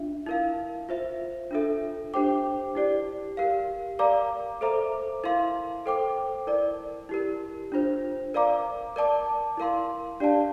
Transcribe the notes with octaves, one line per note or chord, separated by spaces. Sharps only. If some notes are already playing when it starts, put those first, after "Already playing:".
Already playing: D4 F4 E5
E4 A#4 F5
F4 C5 E5
D4 F4 A4 E5
D4 G4 C5 G5 D6
E4 G4 D5
G4 A#4 F5
A#4 D5 F5 A#5 D6
A4 C5 E5 A#5 D6
E4 A#4 F5 C6
A4 C5 G5 D6
E4 A#4 D5
E4 G4 A#4
D4 F4 C5
A#4 D5 F5 A#5 D6
A#4 D5 A5 D6
E4 A#4 F5 C6
D4 G4 D5 F5 A5